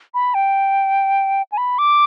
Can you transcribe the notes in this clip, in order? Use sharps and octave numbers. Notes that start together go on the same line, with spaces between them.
B5
G5
G#5
B5
D6